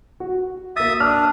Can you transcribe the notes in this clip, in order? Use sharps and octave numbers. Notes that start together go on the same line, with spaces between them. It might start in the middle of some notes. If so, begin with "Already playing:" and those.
F#4
A#3 E5 D#6 A6
D4 D6 F6